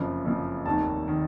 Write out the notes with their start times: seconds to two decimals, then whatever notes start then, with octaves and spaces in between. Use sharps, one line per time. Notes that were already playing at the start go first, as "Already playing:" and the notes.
Already playing: F#1 F2 C#3 F3
0.25 F#1 F2 C#3 F3
0.66 F1 D#2 D#3 A5
1.08 D#3